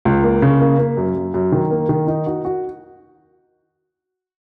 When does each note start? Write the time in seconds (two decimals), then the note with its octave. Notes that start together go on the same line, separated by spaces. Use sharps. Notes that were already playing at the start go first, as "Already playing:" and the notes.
0.05 C#2
0.23 A#3
0.42 C#3
0.60 A#3
0.79 A#3
0.97 F#2
1.15 F#2
1.34 F#2
1.52 D#3
1.71 A#3
1.89 D#3
2.07 D#4
2.26 F#4
2.45 F#4